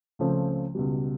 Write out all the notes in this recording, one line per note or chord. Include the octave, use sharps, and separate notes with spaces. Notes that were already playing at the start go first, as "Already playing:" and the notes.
C#2 C#3 F3 A3 C4
C#2 B2 G3